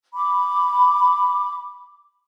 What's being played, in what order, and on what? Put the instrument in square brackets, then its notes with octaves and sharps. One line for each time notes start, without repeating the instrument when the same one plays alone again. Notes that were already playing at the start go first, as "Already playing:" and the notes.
[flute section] B5 D6